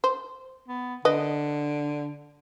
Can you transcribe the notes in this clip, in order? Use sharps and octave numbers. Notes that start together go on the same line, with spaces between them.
C5
B3
D3 B4 D#5